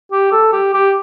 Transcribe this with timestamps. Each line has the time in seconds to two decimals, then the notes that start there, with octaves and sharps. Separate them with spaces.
0.12 G4
0.32 A4
0.52 G4
0.74 G4